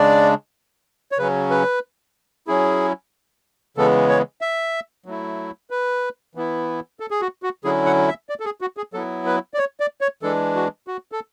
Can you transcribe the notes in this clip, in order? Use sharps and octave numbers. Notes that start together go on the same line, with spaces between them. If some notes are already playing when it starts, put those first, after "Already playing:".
Already playing: C#3 G#3 D4 D5
C#5
C#3 F#3 C#4 B4
B4
F#3 C#4 E4 G#4
C#3 E3 G#3 B3 A4
C#5
E5
F#3 A3 E4
B4
E3 B3 E4
A4
G#4
F#4
F#4
D3 F#3 C#4 E4 G#4
F#5
E5
D5
A4
G#4
F#4
G#4
F#3 B3 E4 A4
B4
D5
C#5
D5
C#5
E3 G#3 D4 A4
F#4
F#4
A4